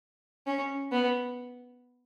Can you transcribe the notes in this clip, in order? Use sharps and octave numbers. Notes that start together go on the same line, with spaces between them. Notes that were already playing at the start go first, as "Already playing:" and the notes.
C#4
B3